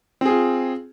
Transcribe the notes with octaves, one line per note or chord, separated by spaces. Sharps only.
C4 F4 G#4